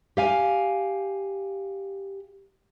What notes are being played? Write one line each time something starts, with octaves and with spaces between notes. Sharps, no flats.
G4 F5 G#5